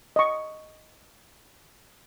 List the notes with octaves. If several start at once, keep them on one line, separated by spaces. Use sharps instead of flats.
D#5 C#6